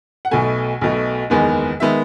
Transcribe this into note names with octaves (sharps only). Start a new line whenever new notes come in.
F#5
B1 B2 A3 G#5
B1 B2 A3
F#1 E2 D#3 G#3 B3
D#3 G#3 B3 E5